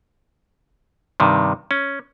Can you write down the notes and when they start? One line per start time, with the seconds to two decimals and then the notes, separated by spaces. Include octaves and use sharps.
1.20 G2 C3 D#3
1.71 C#4